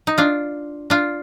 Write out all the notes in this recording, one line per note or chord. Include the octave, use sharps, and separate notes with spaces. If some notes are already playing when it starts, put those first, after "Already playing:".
D#4
D4 F4
D4 F4